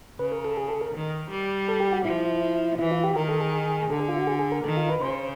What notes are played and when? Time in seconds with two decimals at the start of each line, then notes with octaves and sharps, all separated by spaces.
0.19 C#3 B4
0.32 A#4
0.45 A4
0.57 G#4
0.68 A4
0.81 A#4
0.94 D#3
1.30 G3
1.68 A4
1.80 G4
1.93 F#4
2.05 F3 E4
2.79 E3 E4
2.91 F4
3.04 G4
3.15 D#3 A#4
3.28 A4
3.41 G#4
3.90 D3 A4
4.00 G#4
4.08 F4
4.18 F#4
4.27 G#4
4.39 G#4
4.52 A#4
4.64 D#3 A4
4.77 F4
4.89 B4
5.01 C#3 C5